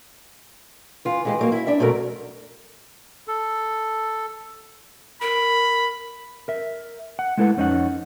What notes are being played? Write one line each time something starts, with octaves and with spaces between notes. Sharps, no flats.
E3 F4
E3 G#3 G4
F#3 A3 A#3
E4 E5
D4 E4 E5
F2 B2 F#3 A3 A#4
A4
A#4 B5
A#4 E5
F#5
G#3 A3 E4 A4 B4 F#5
F2 C#4 D#4 E4 F#5